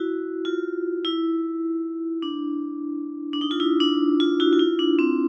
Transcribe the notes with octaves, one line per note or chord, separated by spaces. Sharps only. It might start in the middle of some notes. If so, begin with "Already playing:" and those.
Already playing: E4 F#4
F4
E4
D4
D4
D#4
F4
E4
D4
F4
E4 F#4
F4
E4
D4
C4